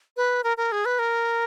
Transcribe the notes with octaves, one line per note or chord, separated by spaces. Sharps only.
B4
A#4
A#4
G#4
B4
A#4